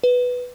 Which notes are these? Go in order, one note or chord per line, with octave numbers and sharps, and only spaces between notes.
B4